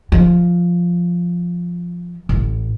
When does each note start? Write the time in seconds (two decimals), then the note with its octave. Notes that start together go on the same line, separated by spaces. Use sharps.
0.12 F3
2.29 A1